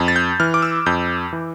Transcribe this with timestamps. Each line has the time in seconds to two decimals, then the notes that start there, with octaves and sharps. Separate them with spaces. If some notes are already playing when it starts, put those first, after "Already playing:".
Already playing: F2
0.08 A6
0.16 G6
0.40 E3 F6
0.54 D6
0.62 E6
0.86 F2 G6
1.33 E3